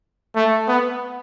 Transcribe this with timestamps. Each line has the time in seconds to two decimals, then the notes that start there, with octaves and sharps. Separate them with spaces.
0.36 A3
0.68 B3